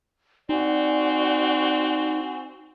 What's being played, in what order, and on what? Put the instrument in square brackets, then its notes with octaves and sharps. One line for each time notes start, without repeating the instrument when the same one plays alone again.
[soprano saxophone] C4 [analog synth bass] D#4 [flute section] F#4 F#5 G#5 [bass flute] D5